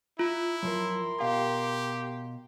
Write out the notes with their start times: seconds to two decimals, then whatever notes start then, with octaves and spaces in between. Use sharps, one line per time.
0.19 E4 F4
0.63 F#2 F3 A#4 C6
1.20 B2 G4 F5